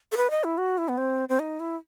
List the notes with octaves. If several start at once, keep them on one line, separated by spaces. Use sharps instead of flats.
A4
B4
D#5
E4
F#4
E4
B3
C4
C4
D#4
E4